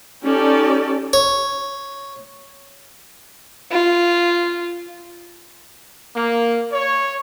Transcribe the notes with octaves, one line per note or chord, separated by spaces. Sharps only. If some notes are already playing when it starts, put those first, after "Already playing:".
C#4 D#4 G4 A4 D5
C#5
F4
A#3
C#5